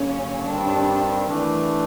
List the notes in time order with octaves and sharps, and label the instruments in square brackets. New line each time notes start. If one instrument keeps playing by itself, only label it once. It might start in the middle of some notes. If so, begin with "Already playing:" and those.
Already playing: [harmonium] G2 D3 F#3 A#3 [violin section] C#4
[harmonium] G2 D#3 G3 C4 [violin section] D4
[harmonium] E3 A3 D4